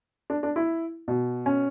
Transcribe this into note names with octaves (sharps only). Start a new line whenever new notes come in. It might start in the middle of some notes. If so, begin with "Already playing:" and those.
D4
D4
E4
B2
C#4